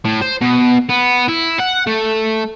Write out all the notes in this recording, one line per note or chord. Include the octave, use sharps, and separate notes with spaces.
A2
C5
B2
B3
E4
F#5
A3